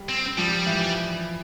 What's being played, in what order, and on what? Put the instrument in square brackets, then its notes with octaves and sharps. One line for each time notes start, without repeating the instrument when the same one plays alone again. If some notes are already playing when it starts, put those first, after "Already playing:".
Already playing: [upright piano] G3
[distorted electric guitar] C4
[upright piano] F3 [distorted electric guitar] G3
[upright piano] E3